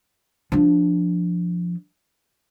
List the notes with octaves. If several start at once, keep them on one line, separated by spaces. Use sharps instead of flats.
F3 D4